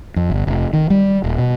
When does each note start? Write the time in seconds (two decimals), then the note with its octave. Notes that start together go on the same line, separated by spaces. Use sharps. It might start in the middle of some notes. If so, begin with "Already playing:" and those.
0.16 F2
0.30 G1
0.47 F1
0.73 D#3
0.90 G3
1.24 D#1
1.38 B2